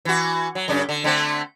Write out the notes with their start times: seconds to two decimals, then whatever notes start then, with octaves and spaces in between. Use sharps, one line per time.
0.05 E3 F#4
0.55 F#3
0.68 F#2 C#3 D4
0.89 D3
1.04 D3 A3 C4